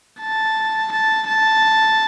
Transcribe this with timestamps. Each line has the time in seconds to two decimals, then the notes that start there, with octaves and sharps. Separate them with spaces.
0.20 A5
0.92 A5
1.27 A5